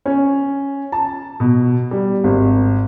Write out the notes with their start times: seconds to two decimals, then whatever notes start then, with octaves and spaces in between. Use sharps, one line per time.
0.06 C#4
0.92 A5
1.40 B2
1.91 G3
2.24 G#1